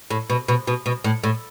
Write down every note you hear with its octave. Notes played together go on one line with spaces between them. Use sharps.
A2
B2
B2
B2
B2
A2
A2